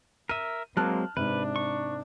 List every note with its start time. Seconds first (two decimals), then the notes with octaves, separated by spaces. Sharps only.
0.29 A#4 E5 D#7
0.77 F#3 G#3 A#3 C4 A5 F6 F#6
1.17 G#2 C3 D4 B4
1.56 C#6